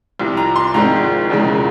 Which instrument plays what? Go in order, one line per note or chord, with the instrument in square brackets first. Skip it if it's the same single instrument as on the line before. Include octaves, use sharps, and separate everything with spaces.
[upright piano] C2 C3 F3
A#5
C6
G#1 G#2 F3 G#3 C4 A#5
E1 E2 C#3 F3 G#3